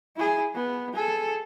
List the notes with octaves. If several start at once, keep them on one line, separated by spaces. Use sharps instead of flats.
E4 G#4
B3
G#4 A4